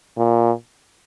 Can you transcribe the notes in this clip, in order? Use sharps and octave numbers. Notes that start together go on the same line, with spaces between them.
A#2